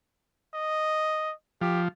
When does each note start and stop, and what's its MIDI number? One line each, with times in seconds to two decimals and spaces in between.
0.54 1.33 75
1.61 1.88 53
1.61 1.82 67